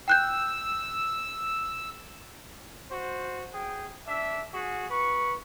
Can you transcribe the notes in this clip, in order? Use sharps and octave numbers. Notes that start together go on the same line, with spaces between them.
G5 E6 F#6 G6
F#4 C5
G#4 G5
D4 E5
F#4 G#4
B4 C#6